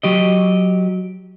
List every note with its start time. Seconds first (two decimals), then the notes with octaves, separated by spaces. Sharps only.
0.03 F#3 G4 D#5